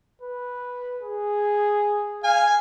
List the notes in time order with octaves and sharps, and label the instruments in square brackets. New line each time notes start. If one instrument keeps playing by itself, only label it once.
[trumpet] B4
G#4
[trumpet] F5 [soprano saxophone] G#5